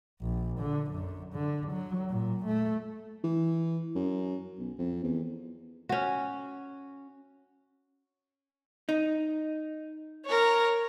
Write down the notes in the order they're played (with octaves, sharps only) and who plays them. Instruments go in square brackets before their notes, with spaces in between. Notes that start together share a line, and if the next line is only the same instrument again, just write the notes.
[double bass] A#1
D3
F#2
D3
F#3
A#2
A3
[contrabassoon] E3
F#2
B1
F2
E2
[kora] C#4 F#4
[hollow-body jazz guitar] D#4
[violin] A#4 C#5